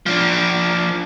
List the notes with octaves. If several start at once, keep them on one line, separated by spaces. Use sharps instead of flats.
F3 D4